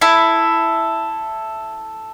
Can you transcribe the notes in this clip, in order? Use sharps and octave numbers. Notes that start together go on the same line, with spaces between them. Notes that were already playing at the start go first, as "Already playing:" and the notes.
E4 A4